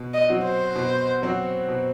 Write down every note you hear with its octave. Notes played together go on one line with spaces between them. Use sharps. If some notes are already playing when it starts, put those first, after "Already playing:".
Already playing: B2
D#5
F#3 C4 F#4
C5
B2
F#3 C4 F#4
B2